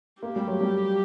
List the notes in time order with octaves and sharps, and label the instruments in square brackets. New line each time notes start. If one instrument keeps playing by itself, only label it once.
[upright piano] A#3 [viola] G4
[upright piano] G3
F#3
G3